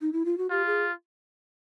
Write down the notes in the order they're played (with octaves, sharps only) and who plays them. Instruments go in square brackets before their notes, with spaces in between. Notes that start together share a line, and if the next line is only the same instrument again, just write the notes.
[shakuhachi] D#4
E4
F4
F#4
[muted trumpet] F4 [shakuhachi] G4
[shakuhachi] G#4